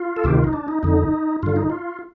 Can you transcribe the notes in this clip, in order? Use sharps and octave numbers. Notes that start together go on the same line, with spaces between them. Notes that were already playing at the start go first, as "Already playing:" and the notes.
Already playing: F4
A4
D2 C3 D#3 G4
F4
D#4
D4
D#4
F2 D3 D#4
G2 D3 F4
D#4
F4